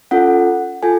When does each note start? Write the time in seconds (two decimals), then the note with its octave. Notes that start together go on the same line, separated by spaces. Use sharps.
0.11 C#4 F4 A4 F#5
0.83 F4 A4 G#5